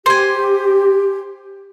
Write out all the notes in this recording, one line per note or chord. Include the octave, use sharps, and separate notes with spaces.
G4 C5 G#5